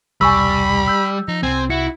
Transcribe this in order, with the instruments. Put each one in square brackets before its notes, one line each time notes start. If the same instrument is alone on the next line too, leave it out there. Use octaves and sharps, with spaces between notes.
[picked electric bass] E1 C2 [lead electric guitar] G3 [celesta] G#5 C#6 E6 [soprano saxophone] B5
[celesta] E6 G6
[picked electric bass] F3 [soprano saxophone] D#4
[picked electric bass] C2 C3 [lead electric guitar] C4 [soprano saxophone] G#5
[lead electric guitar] E4 [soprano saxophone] F#4 [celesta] C#7